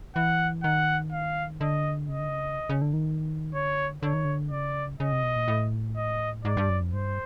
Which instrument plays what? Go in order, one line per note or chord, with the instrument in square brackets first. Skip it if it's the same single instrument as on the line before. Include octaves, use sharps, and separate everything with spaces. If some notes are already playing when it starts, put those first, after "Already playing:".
[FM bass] E3 [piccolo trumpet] F#5
[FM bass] D#3 [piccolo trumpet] F#5
[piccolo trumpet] F5
[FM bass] D3 [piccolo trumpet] D#5
[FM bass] C#3 [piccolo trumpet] D#5
[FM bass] D3
C#3
C#3
D3
D#3
[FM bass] D3 [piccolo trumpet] C#5
[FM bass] D3 [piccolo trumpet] C#5
[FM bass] D#3
D3
[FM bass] C#3 [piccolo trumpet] D5
[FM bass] C#3 [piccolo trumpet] D#5
[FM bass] C3
B2
A#2
A2
[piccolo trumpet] D#5
[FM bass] G#2 [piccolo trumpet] D5
[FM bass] G2
F#2
F2
[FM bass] G2 [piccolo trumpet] C5